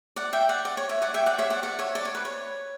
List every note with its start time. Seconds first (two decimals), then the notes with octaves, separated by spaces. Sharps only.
0.16 D5 F#5
0.33 E5 G5
0.49 D5 F#5
0.65 D5
0.77 C#5
0.89 C#5 E5
1.02 D5 F#5
1.14 E5 G5
1.26 D5 F#5
1.38 C#5 E5
1.50 D5 F#5
1.63 D5 F#5
1.79 C#5 E5
1.95 D5
2.05 C#5
2.15 B4
2.25 C#5